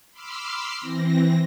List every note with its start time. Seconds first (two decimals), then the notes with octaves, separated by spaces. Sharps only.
0.11 B5 C6 D6 E6 F6 C7
0.80 E3 C4 A#6